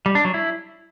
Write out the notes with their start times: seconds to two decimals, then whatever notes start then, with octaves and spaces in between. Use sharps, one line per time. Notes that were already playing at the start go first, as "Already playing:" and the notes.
0.06 G3
0.15 D4
0.25 F#3
0.34 E4